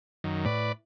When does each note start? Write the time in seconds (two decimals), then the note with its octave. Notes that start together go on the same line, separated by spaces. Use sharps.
0.24 F#2 D#3
0.45 A2 B4 D5